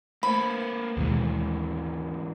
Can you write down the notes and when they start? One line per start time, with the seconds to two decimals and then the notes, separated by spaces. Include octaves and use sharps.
0.23 A3 A#3 B4 C5 B5
0.97 D#2 G#2 B2 E3 G#3